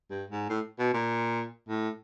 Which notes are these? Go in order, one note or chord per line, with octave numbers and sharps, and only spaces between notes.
G2
G#2
A2
B2
A#2
A2